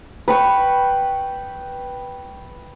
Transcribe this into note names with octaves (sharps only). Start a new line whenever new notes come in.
B4 G5 C#6